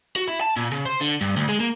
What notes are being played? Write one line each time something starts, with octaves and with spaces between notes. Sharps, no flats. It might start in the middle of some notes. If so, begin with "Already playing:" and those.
F#4
E4
A5
A#2
C#3
C5
D3
G2
D2
G#3
A#3